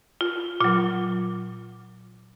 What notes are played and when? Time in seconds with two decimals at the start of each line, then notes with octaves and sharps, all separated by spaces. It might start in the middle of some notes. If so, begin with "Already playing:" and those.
0.21 F4
0.60 A#2 F#3 F4